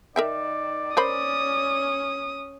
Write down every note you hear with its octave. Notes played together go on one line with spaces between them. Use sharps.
D#3 A#4 D5 E5 G5
C#4 A#4 C5 B5 D#6